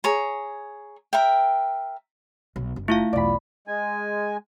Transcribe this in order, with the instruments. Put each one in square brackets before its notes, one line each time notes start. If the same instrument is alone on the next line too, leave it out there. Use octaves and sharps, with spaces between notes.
[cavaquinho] G#4 C#5 A#5
A#4 E5 G5
[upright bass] B1
F#1
[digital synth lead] A3 [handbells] E4 F4 F5
[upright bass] B1 E2 [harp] D5 B5
[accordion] G#3 G#5